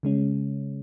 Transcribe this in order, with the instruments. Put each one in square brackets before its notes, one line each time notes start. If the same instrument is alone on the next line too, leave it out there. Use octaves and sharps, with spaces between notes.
[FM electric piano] C#3 G#3 C#4